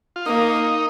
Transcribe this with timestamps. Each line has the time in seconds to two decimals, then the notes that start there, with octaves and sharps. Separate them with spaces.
0.16 F4
0.26 A#3 D#4